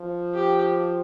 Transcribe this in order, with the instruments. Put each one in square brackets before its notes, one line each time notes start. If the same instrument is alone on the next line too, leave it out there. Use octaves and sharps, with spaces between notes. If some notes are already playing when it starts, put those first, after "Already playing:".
Already playing: [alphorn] F3
[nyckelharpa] G4